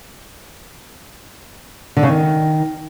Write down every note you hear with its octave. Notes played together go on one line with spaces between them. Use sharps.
D3
C#3
D#3